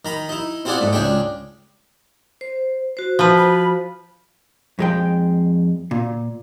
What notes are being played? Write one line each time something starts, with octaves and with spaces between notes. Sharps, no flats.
D#3 A#5 B5
D#4 E4
C4 E4 F4 G#4 D5 F#5
G#2 A3
C#2 D4 G#4 G5
C5
F#4 C5
F3 B4
B5
F2 G#3 G5
A#2